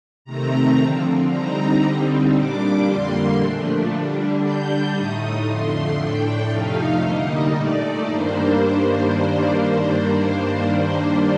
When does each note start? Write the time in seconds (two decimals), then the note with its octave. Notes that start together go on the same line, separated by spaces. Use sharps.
0.25 C3 D#3 A3 C4 A#5
0.77 D3 F3 C4
1.29 D3 G3 C4 D#4 A#5
1.81 D3 G3 C4 D#4
2.33 A#2 G3 D4 D6
2.85 F2 D3 G3 A#3 C6
3.37 A#2 F3 A3 D4
3.89 D3 G3 D4
4.41 D3 G3 D4 G6
4.94 A2 A3 D#4 D#6
5.45 F2 D3 F3 A3 C6
5.97 A2 A3 D4 G5
6.50 F2 C3 F3 A3 D#4 F5
7.01 D3 G3 A#3 D#4 D#5
7.54 A#2 A3 D#4 D5
8.06 G2 D#3 G3 A#3 D4 C5